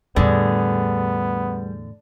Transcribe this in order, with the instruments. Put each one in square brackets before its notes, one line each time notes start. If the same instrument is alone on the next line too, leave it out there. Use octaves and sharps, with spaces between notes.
[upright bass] E2 A2 [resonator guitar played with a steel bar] D3 [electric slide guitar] G3 G#4 [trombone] B3